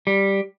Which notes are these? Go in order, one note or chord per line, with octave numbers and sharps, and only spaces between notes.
G3